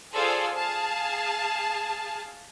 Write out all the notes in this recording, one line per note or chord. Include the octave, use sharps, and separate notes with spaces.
F4 G#4 A4 C5 D5 F5
G#4 F5 A5